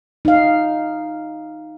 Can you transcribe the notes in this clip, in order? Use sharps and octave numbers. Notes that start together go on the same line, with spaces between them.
D#4 F5